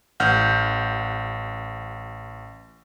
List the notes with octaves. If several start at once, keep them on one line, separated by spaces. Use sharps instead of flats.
A1 F#5 F6 G6